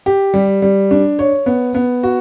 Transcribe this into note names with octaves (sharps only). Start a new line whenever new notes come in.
G4
G3
G3
D4
C#5
B3
B3
F#4